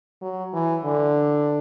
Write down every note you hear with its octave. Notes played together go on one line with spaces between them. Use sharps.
F#3
E3
D3